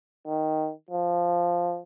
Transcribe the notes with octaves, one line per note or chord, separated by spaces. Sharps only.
D#3
F3